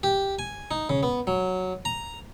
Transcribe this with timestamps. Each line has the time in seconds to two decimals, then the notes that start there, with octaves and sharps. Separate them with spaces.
0.03 G4
0.39 G#5
0.71 D#4
0.89 C#3
1.03 B3
1.27 F#3
1.85 A#5